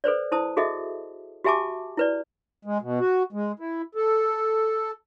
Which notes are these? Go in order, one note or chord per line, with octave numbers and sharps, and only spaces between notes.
A4 B4 C5 D5
E4 C5 A5 D#6
F#4 G#4 A4 D#5 E5
F#4 G4 E5 G#5 A5 D6
E4 B4 D5
G#3
B2
F#4
G#3
E4
A4